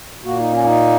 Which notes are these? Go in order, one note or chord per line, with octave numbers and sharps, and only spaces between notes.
A#2 A#3 F#4
D#4
C#4
D#4